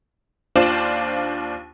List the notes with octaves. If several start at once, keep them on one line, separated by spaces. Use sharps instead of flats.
D#2 D4 F4 C5 E7